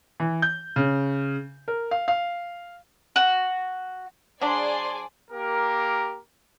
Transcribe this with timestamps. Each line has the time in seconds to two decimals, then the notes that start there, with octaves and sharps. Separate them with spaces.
0.20 E3
0.42 G6
0.76 C#3
1.68 A#4
1.91 F5
2.08 F5
3.16 F#4
4.41 F#3 D4 G#4 C5 D5 C6
5.31 A#3 G4 A#4